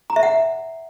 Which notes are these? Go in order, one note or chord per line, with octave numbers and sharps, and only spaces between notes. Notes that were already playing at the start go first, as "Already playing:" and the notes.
A#5
E5
F#5